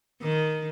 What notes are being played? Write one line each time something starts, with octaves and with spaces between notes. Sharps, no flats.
D#3